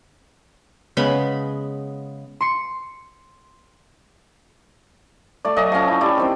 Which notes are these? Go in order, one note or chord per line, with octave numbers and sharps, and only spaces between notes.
C#3 G#3 B3 B5
C6 C#7
A3 D5
F#3 A3 D#5 G#5
F3 C#4
E4
E4 G4 D5
D#3 C4 C5